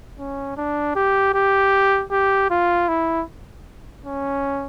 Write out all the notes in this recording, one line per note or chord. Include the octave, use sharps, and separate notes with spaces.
C#4
D4
G4
G4
G4
F4
E4
C#4